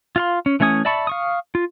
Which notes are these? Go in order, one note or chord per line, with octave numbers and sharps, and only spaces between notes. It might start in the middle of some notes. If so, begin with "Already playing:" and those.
F4 F5 C6
C#4
E3 A3 C#4 G#5 D#6
D5 E5 A5 B5 C#6
F5 C#6 D#6
F4